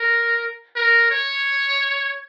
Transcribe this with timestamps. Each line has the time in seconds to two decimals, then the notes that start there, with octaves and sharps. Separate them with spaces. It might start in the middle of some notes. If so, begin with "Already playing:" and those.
Already playing: A#4
0.76 A#4
1.11 C#5